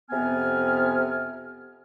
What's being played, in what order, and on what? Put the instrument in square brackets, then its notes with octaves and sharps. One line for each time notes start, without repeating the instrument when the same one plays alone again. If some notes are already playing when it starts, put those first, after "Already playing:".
[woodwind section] F2 C3 B3 G#5 F6